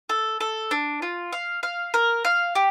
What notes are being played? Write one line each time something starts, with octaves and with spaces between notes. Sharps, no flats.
A4
A4
D4
F4
F5
F5
A#4
F5
G4